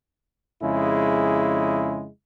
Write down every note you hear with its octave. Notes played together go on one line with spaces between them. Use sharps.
F2 C#3 G#3 E4